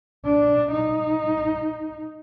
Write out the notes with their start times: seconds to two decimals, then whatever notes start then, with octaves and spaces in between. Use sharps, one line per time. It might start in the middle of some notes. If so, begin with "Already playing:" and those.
0.25 D4
0.71 D#4